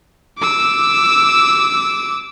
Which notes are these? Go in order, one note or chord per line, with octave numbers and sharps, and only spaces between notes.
D6 E6